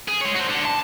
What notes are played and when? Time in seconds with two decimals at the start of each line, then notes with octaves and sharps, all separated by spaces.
0.08 G#4
0.21 G#3 C#5
0.36 F#4 C5
0.49 D3
0.65 A5